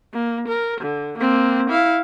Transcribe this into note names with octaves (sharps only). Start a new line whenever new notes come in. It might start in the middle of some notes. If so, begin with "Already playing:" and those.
A#3
A#4
D3
A#3 C4
E4 F5